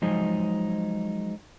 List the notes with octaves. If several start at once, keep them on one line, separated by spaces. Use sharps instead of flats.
F3 F#3 G#3 D#4 G#4 C5